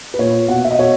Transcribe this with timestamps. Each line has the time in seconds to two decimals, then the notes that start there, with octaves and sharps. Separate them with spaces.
0.14 B4
0.19 A#2 C#5
0.48 B2 F#5
0.64 E5
0.71 D#5
0.78 B2 C#5